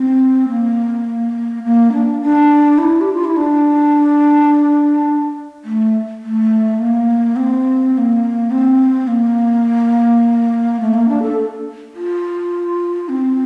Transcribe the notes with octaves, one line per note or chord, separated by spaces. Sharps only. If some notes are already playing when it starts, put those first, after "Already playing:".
Already playing: C4
A#3
A#3
D4
D4
E4
G4
F4
E4
D4
A3
A3
A#3
C4
C4
A#3
C4
A#3
A3
A#3
D4
A4
F4
C4